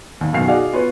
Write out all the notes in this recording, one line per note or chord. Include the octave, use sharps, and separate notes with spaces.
D#2
F#2 B2 D#3 F5 C7
D#4 F#4 G#4 D5 F5
B3 F4 B4 C#5